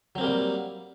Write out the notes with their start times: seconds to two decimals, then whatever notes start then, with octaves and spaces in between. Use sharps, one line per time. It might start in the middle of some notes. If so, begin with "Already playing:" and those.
0.15 F#3
0.18 C4
0.21 A#3
0.24 G3